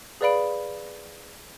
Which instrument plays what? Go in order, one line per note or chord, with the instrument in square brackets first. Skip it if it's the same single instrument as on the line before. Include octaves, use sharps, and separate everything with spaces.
[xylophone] G#4 B4 D5 F5 B5 D7